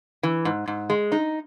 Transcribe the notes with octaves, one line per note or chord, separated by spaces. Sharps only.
E3
G#2
G#2
G#3
D#4